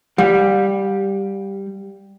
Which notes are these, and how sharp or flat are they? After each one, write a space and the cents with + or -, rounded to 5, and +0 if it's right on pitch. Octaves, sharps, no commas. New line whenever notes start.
G3 +0 F5 +45